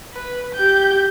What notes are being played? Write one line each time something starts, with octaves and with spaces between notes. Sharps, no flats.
B4
G4 G6